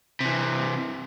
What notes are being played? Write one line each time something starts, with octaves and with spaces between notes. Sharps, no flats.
C3 E3